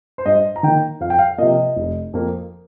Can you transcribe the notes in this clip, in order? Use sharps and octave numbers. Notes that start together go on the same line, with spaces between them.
C5
G2 D#5
A#5
D#3 A#3 G5
F2 F5
G5
F5
C3 F3 A#3 D#5
F1
F2 F3 A#3